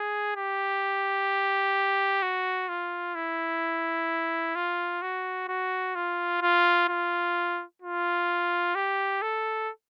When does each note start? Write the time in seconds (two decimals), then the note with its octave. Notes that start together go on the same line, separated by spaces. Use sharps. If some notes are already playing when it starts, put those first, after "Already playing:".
Already playing: G#4
0.37 G4
2.22 F#4
2.69 F4
3.15 E4
4.56 F4
5.02 F#4
5.48 F#4
5.95 F4
6.41 F4
6.89 F4
7.82 F4
8.75 G4
9.22 A4